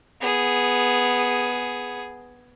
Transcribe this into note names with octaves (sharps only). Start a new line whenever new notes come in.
B3 G#4